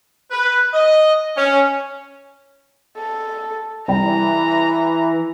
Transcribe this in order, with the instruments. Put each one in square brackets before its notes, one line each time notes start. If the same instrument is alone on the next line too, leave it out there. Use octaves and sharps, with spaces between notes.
[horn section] B4
D#5
C#4
[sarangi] A4
[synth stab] C2 G3 [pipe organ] E3 [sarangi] A#5